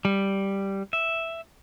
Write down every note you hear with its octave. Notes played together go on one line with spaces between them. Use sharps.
G3
E5